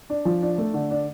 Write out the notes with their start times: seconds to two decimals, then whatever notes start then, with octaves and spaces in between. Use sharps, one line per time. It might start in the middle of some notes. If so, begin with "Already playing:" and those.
0.10 D4
0.25 F3
0.43 D4
0.58 A3
0.74 D3
0.91 D4